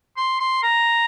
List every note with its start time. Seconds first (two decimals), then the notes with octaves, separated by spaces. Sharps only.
0.17 C6
0.40 C6
0.63 A#5